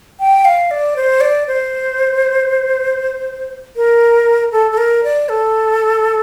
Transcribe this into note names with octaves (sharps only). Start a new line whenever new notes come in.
G5
F5
D5
C5
D5
C5
A#4
A4
A4
A#4
D5
A4